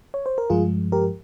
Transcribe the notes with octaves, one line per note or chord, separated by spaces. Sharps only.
C#5
C5
A#4
G2 F3 G#3 F4 G#4
G4 A#4